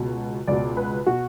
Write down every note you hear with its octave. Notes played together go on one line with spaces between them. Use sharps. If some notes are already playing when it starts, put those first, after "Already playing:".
Already playing: C#2 B2
C#2 B2 D5
B4
B2 F#4